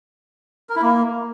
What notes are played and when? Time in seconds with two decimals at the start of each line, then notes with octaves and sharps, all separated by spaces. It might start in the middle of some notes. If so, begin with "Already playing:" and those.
0.69 A#4
0.76 E4
0.82 A#3